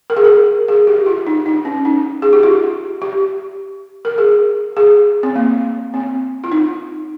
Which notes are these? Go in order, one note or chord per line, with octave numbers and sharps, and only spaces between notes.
A#4
G#4
A#4
G#4
G4
F4
D#4
D#4
C#4
D#4
G#4
G4
F4
G4
A#4
G#4
G#4
C4
A#3
C4
F4
D#4